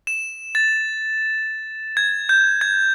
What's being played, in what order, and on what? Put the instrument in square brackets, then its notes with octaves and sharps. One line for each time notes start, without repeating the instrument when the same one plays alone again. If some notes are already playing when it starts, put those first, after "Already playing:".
[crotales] E7
A6
G#6
G6
G#6